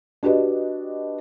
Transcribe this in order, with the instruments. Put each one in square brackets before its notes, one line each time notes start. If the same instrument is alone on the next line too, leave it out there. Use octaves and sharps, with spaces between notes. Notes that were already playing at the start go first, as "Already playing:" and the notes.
[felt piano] D4 F#4 G4 B4 D#5